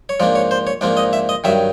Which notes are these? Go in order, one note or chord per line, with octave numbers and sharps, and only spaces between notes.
C#5
G#2 F3 A#3 D4 D5
C#5
C5
C#5
G#2 F3 A#3 D4 D5
D#5
E5
D#5
G2 D#3 F#3 E5